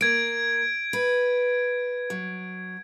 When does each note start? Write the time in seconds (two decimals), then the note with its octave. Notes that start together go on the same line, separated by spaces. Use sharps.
0.01 A#3 G#6 D7
0.93 B4
2.10 F#3